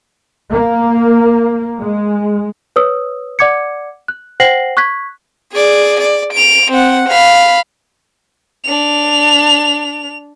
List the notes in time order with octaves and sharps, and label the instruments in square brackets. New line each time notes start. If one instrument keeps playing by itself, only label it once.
[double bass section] A#3
G#3
[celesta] B4 C#5 D#6 E6
D5 F#5 D6 G#6 C#7
F#6
C5 F#5 G5 A#6 C7 F#7
C#6 F#6 G#6 B6
[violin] G#4 D5
D5
D7 F7
C4 F#5
F5 B5
D4 F7